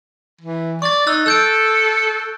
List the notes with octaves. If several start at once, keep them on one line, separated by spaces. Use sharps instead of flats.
E3
D5 C#6 A6
D#4 E6 F#6 A6
A4 E6 G6 D7